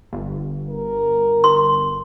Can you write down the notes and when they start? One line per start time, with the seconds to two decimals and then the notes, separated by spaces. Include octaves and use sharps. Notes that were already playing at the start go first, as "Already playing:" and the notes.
0.13 G1
0.70 A#4
1.44 C6